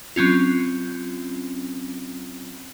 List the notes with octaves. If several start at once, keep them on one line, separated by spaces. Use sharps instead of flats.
F#3 C4 C#4 F4